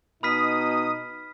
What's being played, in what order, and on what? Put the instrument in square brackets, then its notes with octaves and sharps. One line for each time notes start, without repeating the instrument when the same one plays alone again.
[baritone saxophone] B2 [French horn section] D#4 [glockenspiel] B5 F6 B6 [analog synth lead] D#6